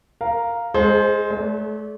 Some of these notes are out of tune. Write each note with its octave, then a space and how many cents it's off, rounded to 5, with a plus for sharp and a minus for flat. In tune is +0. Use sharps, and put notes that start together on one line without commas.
A#4 +0 F5 +0
G#3 +0 G#4 +45 C5 +0
A3 -40 A#4 +0 D5 -40